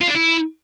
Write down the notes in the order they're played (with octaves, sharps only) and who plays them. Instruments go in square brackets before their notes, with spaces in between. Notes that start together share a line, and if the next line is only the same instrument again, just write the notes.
[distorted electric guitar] F4
D4
E4